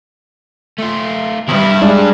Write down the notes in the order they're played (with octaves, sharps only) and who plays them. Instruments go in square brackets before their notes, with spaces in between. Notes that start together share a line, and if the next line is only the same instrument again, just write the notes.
[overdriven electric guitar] A3 F4
[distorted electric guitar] E2 G2 [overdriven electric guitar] E4
[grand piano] G#3 D4